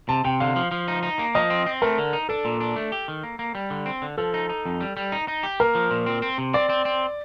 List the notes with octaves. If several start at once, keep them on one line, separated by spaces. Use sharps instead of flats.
C3 A5
C3 G5
D3 F5
F3
F3
D#4
D#4
A#3
F3 D#5
C4
C4
A3 A#4
D3
D#4
D4 A4
A#2
D4
A3
G4
D#3
A#3
A#3
G3
D3
C4
D3
F3 A4
D#4
D#4
F2
G3
G3
D#4
D#4
G4
A#3 A#4
F3
A#2
C4
C4
C3
C4 D5
C4
C4